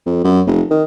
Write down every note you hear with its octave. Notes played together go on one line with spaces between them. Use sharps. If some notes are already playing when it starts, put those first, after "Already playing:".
F2
F#2
F1
D#3